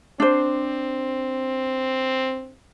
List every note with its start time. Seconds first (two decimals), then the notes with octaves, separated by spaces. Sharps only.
0.20 C4 D4 C5